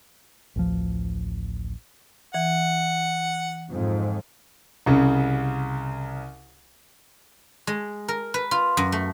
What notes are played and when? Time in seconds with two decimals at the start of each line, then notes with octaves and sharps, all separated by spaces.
0.56 A1 D2 F3
2.34 E3 F#5
3.70 F2 G#2
4.86 C2 C#3
7.67 G#3
8.08 A#4
8.34 B4
8.51 F4
8.77 F#2
8.92 A3